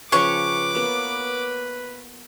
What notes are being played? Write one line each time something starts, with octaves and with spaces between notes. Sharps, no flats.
C#3 F3 B4 C#5 G5 C#6 D6
A#3 B3